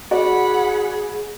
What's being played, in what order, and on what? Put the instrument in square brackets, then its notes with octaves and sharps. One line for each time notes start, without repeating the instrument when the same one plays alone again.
[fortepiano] F#4 D5 [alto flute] G#4 [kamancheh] F#5 B5